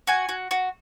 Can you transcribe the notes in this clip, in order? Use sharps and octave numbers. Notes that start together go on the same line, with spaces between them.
F#4 G#5
F#4
F#4